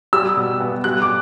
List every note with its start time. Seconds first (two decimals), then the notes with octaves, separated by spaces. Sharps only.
0.13 G3 E6
0.37 B2
0.60 B3
0.84 G3 F#6
1.02 D6